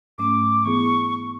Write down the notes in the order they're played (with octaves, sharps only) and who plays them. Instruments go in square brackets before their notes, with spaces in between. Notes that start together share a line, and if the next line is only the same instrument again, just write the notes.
[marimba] G#2 F#3 A3 C#4 [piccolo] D6
[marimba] E3 B3 E4 G#4 [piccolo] C#6